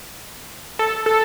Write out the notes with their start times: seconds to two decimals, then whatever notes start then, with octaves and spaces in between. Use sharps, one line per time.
0.79 A4
1.06 A4